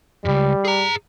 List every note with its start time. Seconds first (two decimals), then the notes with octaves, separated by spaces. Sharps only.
0.25 C#2 F#2 G3
0.65 G#4 A#5